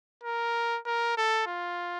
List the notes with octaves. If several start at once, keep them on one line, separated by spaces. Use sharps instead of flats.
A#4
A#4
A4
F4